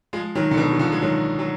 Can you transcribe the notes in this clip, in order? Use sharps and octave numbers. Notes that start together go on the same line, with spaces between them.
F3 G#3
D#3 F#3
D3
B2 D#3
F#3
D3 F3
G#3
D#3 F#3
F#3